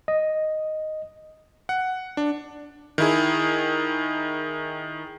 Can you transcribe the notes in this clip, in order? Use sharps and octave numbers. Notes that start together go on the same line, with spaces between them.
D#5
F#5
D4
D#3 E4 G#4